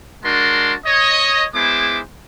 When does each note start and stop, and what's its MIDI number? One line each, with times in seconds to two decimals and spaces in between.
0.24 0.73 56
0.24 0.73 62
0.24 0.73 66
0.24 0.73 70
0.24 0.73 81
0.24 0.73 84
0.85 1.44 73
0.85 1.44 75
1.54 2.00 56
1.54 2.00 59
1.54 2.00 64
1.54 2.00 68
1.54 2.00 72
1.54 2.00 86